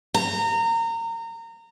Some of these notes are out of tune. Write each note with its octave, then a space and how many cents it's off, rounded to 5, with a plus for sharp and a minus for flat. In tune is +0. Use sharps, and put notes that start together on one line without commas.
A#5 -25